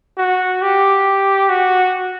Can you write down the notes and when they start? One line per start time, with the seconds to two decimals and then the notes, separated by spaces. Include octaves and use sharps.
0.18 F#4
0.62 G4
1.49 F#4